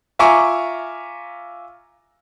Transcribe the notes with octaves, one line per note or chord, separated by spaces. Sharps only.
F4 E5 G#5 A#5 C#6 D6